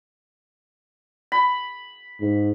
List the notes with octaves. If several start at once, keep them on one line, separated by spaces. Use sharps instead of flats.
B5
G#2